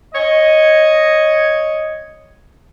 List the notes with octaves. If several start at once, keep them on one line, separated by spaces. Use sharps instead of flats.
C#5 D#5